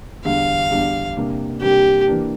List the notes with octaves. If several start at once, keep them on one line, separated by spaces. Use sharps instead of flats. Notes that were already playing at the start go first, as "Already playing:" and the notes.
E2 D3 G3 D4 F5
E2 D3 G3 D4
C3 G3 A#3 D4
C3 G3 A#3 D4 G4
E3 A#3 D4